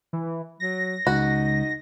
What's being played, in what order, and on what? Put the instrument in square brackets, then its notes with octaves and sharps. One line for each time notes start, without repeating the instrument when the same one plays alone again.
[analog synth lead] E3
[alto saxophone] F#3 [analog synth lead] A#6
[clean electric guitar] C#2 [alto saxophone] D#4 [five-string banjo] F#4